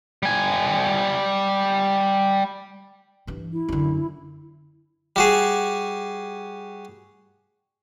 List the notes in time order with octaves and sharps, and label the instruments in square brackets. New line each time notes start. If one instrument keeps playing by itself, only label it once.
[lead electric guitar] G3 G#5
[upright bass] G2 E3
[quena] E4
[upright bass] F#2 D3
[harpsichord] G3 F#4 G#4